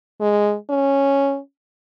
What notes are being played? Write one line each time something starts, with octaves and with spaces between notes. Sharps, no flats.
G#3
C#4